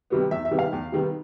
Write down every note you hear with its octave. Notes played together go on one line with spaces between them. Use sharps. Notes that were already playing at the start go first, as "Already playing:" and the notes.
C3 D#3 G3 B3
E2 E5
E5
C3 D#3 G3 B3
F5
E2
C3 D#3 G3 B3